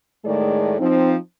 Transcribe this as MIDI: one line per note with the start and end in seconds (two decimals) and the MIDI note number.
0.25 0.77 45
0.25 0.77 51
0.25 0.77 56
0.25 0.77 57
0.25 0.77 68
0.25 0.77 74
0.80 1.15 53
0.80 1.15 60
0.80 1.15 63